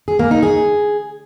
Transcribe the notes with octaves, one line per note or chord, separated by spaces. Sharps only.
G#4
A#3
D#4
G#4